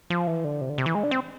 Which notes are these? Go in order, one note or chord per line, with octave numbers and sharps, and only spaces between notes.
F3
E3
D3
C3
D3
C3
E3
G#3
D4
C4